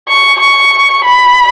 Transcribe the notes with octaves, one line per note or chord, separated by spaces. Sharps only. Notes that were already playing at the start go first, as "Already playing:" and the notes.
C#6
C#6
B5